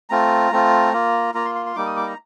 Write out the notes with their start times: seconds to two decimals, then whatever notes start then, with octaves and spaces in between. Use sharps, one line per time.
0.10 A3 C4 F4 A#5
0.52 A3 C4 F4
0.93 A#3 F4
1.34 A#3 F4 A#5
1.45 C6
1.55 C6
1.66 C6
1.76 G3 A#3 D#4 D6
1.86 D#6
1.96 D6
2.07 A#5